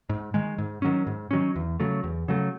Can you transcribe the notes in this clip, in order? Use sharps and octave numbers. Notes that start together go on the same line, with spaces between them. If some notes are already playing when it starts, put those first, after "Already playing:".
G#2
D#3 G#3
G#2
D#3 F#3 C#4
G#2
D#3 F#3 C#4
E2
C#3 F#3 A3
E2
C#3 F#3 A3